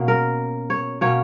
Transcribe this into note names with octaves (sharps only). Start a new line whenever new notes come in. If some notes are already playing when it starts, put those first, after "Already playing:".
Already playing: B2 A#3 C#4
A#4
C#5
B2 A#3 C#4 C#5